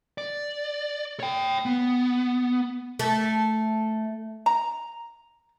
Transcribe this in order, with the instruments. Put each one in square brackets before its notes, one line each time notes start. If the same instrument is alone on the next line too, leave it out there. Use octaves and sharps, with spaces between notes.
[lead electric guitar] D5
C#5 G5
B3
[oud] A3
[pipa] A#5